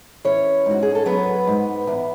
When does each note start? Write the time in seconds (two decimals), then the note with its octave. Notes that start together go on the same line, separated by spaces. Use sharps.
0.25 E3 C#4 C#5
0.66 G#2 F#4
0.82 G#4
0.95 A4
1.06 F#3 B3 B4
1.47 G#2
1.87 E2